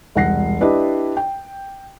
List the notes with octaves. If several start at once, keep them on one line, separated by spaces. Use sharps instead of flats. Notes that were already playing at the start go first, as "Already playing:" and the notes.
E1 C2 F#5 A#6 C7
D4 E4 G4 B4 D5 D#5
G5